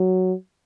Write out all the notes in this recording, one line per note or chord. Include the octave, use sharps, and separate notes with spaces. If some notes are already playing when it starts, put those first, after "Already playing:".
Already playing: F#3